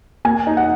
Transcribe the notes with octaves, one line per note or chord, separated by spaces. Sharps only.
A#3 G#5
D#4
F#5